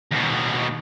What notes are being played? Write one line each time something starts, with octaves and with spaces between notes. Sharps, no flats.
D#2 B2